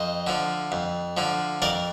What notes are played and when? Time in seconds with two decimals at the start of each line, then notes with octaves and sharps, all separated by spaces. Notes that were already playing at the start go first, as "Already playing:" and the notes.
Already playing: F2 C5 D#5
0.27 D3 F3
0.72 F2
1.17 D3 F3
1.62 F2 A#4 D5